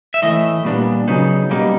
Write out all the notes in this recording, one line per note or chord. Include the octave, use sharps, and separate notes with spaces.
E5
A2 E3 A3 D#5
A#2 G3 B3 D4
C#3 F#3 B3 D#4
B2 G3 A#3 D#4